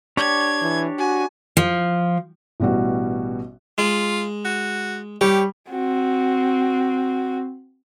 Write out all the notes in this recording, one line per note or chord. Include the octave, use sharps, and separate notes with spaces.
D4 G4 C#5 G#6
E3
F#4 G#5
F3
A1 B2 G3 F#4
G#3 F4
F#4
G3 G4 C#5
C4 F#4